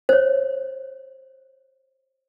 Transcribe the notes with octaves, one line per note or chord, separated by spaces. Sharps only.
C5 C#5